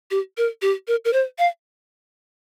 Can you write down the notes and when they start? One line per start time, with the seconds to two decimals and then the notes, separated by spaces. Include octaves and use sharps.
0.11 G4
0.38 A#4
0.62 G4
0.88 A#4
1.05 A#4
1.13 C5
1.39 F5